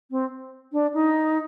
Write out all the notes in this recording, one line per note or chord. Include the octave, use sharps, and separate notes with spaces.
C4
D4
D#4